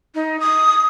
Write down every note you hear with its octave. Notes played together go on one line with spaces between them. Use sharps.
D#4
D#6